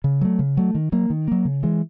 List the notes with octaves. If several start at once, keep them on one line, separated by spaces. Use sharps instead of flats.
C#3
F#3 A3
C#3
F#3 A3
D#3
F#3 A#3
D#3
F#3 A#3
C#3
E3 G#3